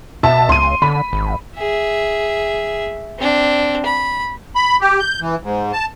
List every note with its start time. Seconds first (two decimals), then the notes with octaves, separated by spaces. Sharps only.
0.23 B2 E5 A5
0.49 C#2 C6 D#7
0.82 D3 B5
1.13 G#1
1.57 G#4 E5
3.19 C4 D4
3.86 B5
4.55 B5
4.81 G4
5.00 G6
5.21 E3
5.44 G#2
5.73 A5